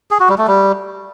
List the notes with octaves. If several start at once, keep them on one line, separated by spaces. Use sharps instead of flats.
G#4
F#4
G3
A3
G3